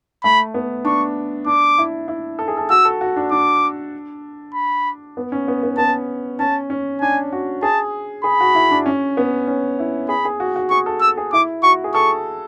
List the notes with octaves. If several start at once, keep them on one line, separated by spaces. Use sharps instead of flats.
A3 B5
B3
D4 C#6
D4 D6
E4
E4
A4
G#4
A4
F#4 E6
A4
F#4
D4
D4 D6
B5
B3
C#4
B3
B3
B3 A5
C#4 A5
C#4
D4 G#5
F#4
G#4 A5
G#4 B5
F#4
E4
D4
C#4
B3
C#4
E4
G#4 B5
G#4
F#4
F#4
G#4 C#6
A4
A4 E6
G#4
E4 D6
F#4 C#6
G#4
A4 C#6